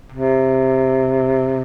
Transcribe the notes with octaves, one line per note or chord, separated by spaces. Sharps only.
C3